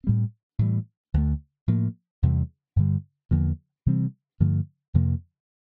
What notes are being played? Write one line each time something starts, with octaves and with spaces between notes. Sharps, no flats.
A2 G3 C4
A2 E3 G3
D2 D3 F3 A3
A2 F3 A#3
E2 C3 E3 G3
G2 D3 G3
E2 D3 F3 A#3
C3 E3 G3 C4
G2 D3 F3 A3
F2 C3 F3 A#3